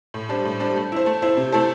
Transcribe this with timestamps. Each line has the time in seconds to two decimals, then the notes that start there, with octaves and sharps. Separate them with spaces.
0.14 A2
0.29 G3 D4 C5
0.45 A2
0.60 G3 D4 C5
0.76 A3
0.92 E4 C5
1.06 A3
1.22 E4 C5
1.37 C3
1.52 A3 E4 A4 C5